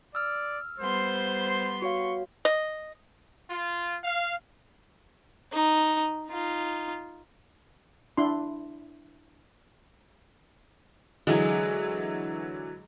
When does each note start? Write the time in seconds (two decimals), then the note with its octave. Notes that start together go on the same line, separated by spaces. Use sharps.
0.15 D5 E6 F6
0.80 G3 B3 C5 C6
1.82 F#4 C#5 F5 C#6
2.45 D#5
3.49 F4
4.04 F5
5.53 D#4
6.29 D#4 F4
8.17 D4 E4 C6
11.27 D3 E3 F#3 G#3